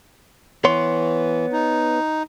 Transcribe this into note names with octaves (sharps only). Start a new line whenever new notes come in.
E3 B3 C#5 C6
D#4